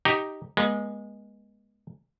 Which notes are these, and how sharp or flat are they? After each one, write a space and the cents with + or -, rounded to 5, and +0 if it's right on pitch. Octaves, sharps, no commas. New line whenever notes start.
D#4 +0 G4 +0 A#5 +15
G#3 -5 B3 -40